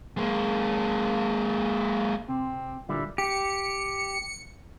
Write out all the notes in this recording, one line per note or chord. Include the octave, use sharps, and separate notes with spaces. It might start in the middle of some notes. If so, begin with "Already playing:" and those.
G#3 A#3
C3 C4
A#2 D3 G3 E4
G4 C#7